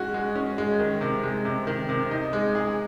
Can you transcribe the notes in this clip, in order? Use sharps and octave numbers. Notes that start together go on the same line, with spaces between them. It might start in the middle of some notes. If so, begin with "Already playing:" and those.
Already playing: G#3 C#4 F#4
G#3
C#4
G#3
D#3
C3
G#3
C3
D#3
C3
D#4
G#3
G#4